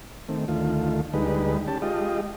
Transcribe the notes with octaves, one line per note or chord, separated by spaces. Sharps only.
D#3 A3 C4
D2 D#3 A3 F4
D2 G3 G#3 D#4 B4
C#4 G4 A5
G#3 F4 G4 D#5